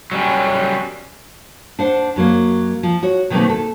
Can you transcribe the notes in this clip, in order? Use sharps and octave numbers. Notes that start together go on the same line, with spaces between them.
F#3 G3 C#4
D4 C5 F#5
F#2 F#3 A#3
F3
F#4 C#5
B2 D#3 F#3 A3 A#3 C4
A4